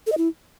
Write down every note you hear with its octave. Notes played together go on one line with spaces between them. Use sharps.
A4
D#5
E4